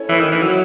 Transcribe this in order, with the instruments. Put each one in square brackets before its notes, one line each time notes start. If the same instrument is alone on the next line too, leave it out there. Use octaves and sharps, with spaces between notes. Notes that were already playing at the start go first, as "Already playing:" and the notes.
Already playing: [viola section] C#4 E4 A4 C#5
[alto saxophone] E3
D#3
E3
F#3